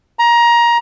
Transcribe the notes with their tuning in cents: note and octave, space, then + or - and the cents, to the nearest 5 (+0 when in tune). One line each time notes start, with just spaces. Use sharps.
A#5 +20